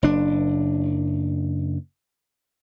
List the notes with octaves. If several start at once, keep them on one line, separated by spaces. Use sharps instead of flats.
F#1 D4